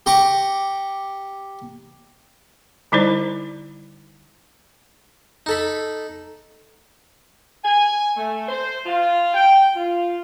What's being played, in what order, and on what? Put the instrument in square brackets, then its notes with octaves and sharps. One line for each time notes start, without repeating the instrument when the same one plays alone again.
[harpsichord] G4 A#5 C#6 D6
[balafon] D3 G3 D#4 E4 C5 D5
[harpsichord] D#4 A4 B5
[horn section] G#5
A3
C5
F4
G5
F4